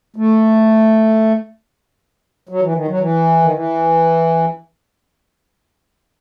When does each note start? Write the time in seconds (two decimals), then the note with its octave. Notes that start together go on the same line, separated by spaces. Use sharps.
0.16 A3
2.49 F#3
2.62 E3
2.75 D#3
2.88 F#3
3.00 E3
3.42 D#3
3.52 E3